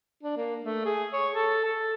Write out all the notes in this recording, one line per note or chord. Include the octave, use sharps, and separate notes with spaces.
D4
A#3
A3
G#4
C#5
A4
A4